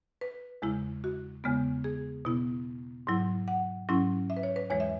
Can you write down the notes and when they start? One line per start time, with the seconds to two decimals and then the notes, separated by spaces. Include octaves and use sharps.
0.21 B4
0.62 E2 C#3 G#3 E4
1.04 F#4
1.44 E2 C#3 G#3 B3
1.84 G#4
2.25 B2 B3 E4
3.07 G#2 F#3 E4
3.48 F#5
3.89 G#2 F#3 C#4 E4
4.30 E5
4.37 B4
4.43 C#5
4.56 B4
4.70 E2 E3 G#3 C#5
4.80 E5